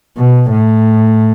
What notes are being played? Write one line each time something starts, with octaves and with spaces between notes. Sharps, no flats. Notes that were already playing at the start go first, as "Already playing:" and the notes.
B2
A2